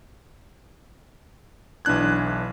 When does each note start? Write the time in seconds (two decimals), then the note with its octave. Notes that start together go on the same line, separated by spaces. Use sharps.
1.85 B1 E3 D4 F#6 G#6